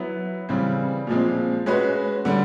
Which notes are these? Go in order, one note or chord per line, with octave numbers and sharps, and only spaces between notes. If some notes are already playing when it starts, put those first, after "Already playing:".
Already playing: F#3 B3 E4
C#3 E3 G3 C4
A#2 F3 G#3 C4
G#3 C#4 F#4 B4
D3 G3